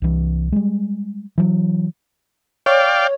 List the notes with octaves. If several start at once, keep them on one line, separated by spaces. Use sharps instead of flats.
C2 E3
G3 G#3
E3 F#3
C#5 D5 F5 G5